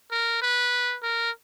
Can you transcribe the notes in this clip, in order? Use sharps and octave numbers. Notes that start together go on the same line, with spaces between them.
A#4
B4
A#4